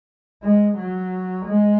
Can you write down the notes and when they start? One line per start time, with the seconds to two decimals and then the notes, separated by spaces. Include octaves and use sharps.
0.43 G#3
0.78 F#3
1.45 G#3